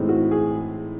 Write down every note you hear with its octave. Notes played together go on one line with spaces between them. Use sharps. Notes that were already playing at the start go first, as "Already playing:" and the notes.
Already playing: A2 E3 G#3 C4 D#4
F#4
G#4